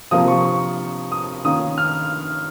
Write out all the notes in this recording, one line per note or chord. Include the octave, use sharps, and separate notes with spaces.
C3 F3 A#3 F4 D#6
C#6
C#6
D#6
D#3 A#3 C#4 F4 D#6
F6